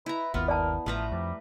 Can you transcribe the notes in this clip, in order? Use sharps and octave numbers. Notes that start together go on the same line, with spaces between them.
E4 B4 A#5
G1 D#2 B3 F4
A#4 D5 A5
A1 F3 A3 B4 A#5
F2 G3